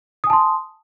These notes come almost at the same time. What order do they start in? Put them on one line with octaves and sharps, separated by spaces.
D#6 G#5 A5 C6